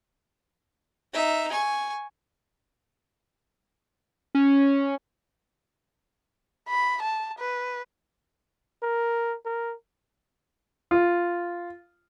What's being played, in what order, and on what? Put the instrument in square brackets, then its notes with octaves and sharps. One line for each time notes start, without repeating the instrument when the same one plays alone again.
[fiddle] D#4 E5
G#5 C#6
[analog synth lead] C#4
[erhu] B5
A5
B4
[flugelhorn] A#4
A#4
[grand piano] F4